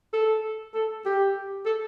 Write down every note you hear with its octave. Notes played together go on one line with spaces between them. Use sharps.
A4
A4
G4
A4